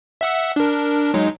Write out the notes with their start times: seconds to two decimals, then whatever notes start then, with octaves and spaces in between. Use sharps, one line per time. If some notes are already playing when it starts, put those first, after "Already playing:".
0.21 E5 F#5 E6
0.56 D4 A#4
1.14 F#3 G#3 D#4